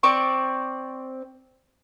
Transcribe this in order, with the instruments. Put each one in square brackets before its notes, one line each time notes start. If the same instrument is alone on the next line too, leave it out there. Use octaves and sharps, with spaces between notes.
[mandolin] C4 D5 C#6